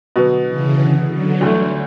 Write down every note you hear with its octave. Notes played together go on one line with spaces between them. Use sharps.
B2 D3 F#3 B3
C#3 E3
D3
D3 F#3
D2 D3 E3 G3 A3